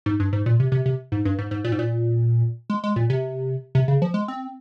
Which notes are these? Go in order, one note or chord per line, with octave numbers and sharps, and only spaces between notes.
G#2
G2
G#2
A#2
C3
C3
C3
G#2
G2
G#2
G#2
A#2
G#2
A#2
G#3
G#3
A#2
C3
C3
C#3
F3
G#3
C4